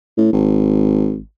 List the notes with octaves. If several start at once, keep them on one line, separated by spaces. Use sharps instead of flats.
A2
G#1